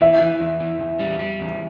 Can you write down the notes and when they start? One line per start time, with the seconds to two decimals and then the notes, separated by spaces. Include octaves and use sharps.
0.01 E3 E5
0.21 E3
0.41 E2
0.60 E3
0.81 E2
0.99 G3
1.19 G3
1.40 E2